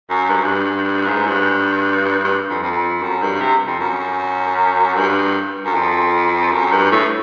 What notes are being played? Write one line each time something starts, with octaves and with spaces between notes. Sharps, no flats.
F#2
G2
F#2
G2
G#2
G2
G2
F2
F2
F#2
G2
C3
F2
F#2
G2
F#2
F2
F#2
G2
A2